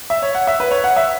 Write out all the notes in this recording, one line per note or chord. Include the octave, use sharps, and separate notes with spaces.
E5
C#5
F#5
E5
B4
C#5
F#5
E5